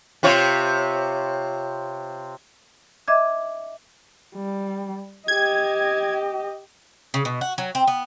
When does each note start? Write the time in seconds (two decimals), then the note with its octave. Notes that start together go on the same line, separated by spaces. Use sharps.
0.23 C3 F4 C#5
3.08 D#5 E5 D6 G#6
4.35 G3
5.28 G4 D#5 G#6
7.14 C#3
7.25 B2
7.41 F#4
7.58 F#3
7.75 C4
7.88 B3